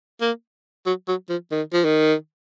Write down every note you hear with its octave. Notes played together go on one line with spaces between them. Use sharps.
A#3
F#3
F#3
F3
D#3
F3
D#3